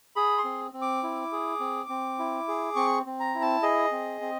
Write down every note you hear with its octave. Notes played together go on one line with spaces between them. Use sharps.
G#4 B5
C6
C4
C4
D6
E4
G#4
C4
C4
E4
G#4
C4 C#6
C4
A#5
E4
A5
G#4 D#5
C4
C4